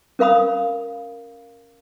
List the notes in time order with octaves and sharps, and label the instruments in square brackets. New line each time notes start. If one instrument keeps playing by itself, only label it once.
[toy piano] C#4 A#4 F5 B5 D#6